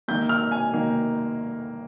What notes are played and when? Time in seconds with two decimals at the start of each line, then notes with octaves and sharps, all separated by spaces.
0.08 D#3 A#3 G6
0.29 F6
0.52 G#5
0.73 D#3 A#3